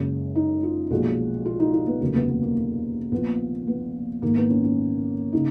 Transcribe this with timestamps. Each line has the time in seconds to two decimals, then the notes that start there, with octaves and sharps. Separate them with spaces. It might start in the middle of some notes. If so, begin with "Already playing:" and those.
Already playing: F#1 F#2 C#3 G#3
0.35 D#4
0.63 F4
0.91 B1 A#2 F3 G#3 F#4
1.45 F4
1.60 D#4
1.73 D#4
1.87 B3
2.01 F1 D#2 C#3 F#3 A#3
2.15 B3
2.29 B3
2.43 A#3
2.57 A#3
3.12 A#1 A#2 F3 B3
3.67 B3
4.22 A#1 G#2 D#3 A#3
4.36 B3
4.50 C#4
4.63 C#4
5.33 C#3 D#4